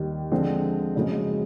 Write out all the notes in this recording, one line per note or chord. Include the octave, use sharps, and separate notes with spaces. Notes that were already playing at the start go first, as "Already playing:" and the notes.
Already playing: D#2 D#3 G3
D3 F3 G#3 C4
F#1 F#2 C#3 F3 G#3